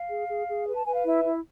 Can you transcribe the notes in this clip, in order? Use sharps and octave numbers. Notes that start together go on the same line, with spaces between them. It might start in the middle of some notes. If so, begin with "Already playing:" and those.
Already playing: F5
G#4
G#4
G#4
B4
A5
B4 G#5
F5
E4 E5
E4